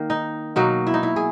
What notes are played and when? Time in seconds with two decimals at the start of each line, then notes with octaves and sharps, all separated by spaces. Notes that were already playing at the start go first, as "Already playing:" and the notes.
Already playing: D#3 A#3
0.10 D#4
0.56 B2 F#3 A#3 D#4
0.87 E4
0.94 D#4
1.03 E4
1.16 G#4